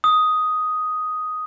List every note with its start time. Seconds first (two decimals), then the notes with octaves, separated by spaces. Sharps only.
0.04 D#6